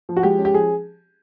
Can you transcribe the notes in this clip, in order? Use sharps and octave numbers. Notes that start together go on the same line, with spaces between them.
F3
F#4
G#3 G4
C#4
G4
F3 G#4